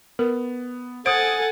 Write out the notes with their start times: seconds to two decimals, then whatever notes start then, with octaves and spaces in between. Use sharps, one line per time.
0.19 B3 A#4
1.06 A4 C5 F#5 G#5 D#6 A6 D7